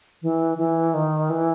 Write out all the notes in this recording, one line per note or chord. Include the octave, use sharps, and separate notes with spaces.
E3
E3
D#3
E3